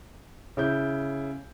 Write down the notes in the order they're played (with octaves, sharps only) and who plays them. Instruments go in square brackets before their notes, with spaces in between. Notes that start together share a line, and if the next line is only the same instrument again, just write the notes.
[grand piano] C#3 E4 G6